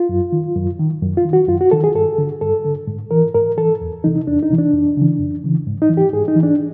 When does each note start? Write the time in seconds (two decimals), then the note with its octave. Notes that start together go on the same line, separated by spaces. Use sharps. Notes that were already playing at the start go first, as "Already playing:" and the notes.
Already playing: F4
0.09 F#2
0.32 D#3
0.56 F#2
0.79 D#3
1.02 F#2
1.17 F4
1.25 D#3
1.33 F#4
1.48 F#2 F4
1.61 F#4
1.71 D#3 A4
1.84 G#4
1.95 G2 A4
2.18 D3
2.41 G2 A4
2.65 D3
2.87 G#2
3.11 E3 A#4
3.35 G#2 A#4
3.58 E3 A4
3.81 E2
4.04 C3 E3 D#4
4.27 E2 D4
4.43 D#4
4.50 C3 E3
4.58 D4
4.73 F2
4.97 C#3 E3
5.19 F2
5.44 C#3 E3
5.67 G#2
5.82 D#4
5.90 E3
5.97 G4
6.13 G#2 G#4
6.28 D#4
6.36 E3
6.43 D4